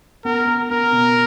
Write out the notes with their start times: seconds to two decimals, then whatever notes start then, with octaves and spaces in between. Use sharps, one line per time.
0.25 B3 A#4
0.47 B3
0.70 B3 A#4
0.92 B2